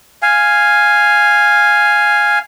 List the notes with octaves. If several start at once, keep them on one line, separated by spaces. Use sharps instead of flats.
F5 G#5